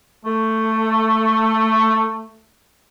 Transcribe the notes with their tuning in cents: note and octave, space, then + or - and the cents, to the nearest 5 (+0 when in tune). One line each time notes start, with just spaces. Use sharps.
A3 +10